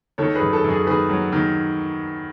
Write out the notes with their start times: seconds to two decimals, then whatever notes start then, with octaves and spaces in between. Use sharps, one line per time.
0.18 D#3 A4 C#5
0.34 G#4 B4
0.41 F#2
0.53 A4
0.64 F#2
0.70 G#4
0.87 D#3 G#4 B4
1.10 F#3
1.32 D#3